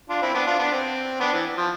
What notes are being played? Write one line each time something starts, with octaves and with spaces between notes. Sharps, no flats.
D4 F4
C4 E4
B3 D4
D4 F4
B3 D4
C4
B3 D4
E3
F3